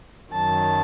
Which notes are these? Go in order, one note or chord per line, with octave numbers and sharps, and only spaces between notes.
F#2 D#3 F#3 A5